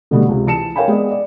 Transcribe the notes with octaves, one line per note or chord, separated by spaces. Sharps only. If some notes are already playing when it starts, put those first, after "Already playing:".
B2 D3 F#3 G3 A3 B3
C#2 C3
E3 A5 C#7 E7
A#4 C#5 F5 G5 G#5 B5
G#3 B3 D5
D5